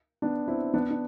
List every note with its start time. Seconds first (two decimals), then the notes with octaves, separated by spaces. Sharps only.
0.22 B3 D4
0.48 C4 E4
0.74 B3 D4
0.91 D4